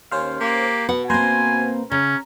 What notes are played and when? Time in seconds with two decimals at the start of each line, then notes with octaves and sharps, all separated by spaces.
0.11 D#2 C#4 C5 F5
0.40 A#3 G4
0.89 B2 B3 F#5
1.10 A#3 C4 B4 C5 G#5 A#5
1.91 C#3 C#4 A#5